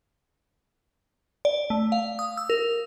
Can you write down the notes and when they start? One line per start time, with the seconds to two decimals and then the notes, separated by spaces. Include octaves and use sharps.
1.45 D5
1.70 A3
1.92 F5
2.19 D#6
2.37 E6
2.50 A#4